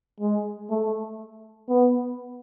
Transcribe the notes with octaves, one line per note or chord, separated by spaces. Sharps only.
G#3
A3
B3